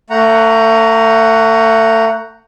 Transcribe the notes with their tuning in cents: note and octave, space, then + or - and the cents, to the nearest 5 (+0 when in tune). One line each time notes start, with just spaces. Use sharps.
A3 +35 F#5 +0 A#5 +0